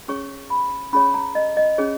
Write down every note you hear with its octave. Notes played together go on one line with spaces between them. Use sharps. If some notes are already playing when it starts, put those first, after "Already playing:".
C#4 G#4 C#5 C#6
B5
C#4 G#4 C#5 B5
A#5
D#5
D#5
C#4 G#4 C#5